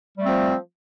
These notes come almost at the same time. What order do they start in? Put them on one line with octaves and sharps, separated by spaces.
G3 A3 C4 F3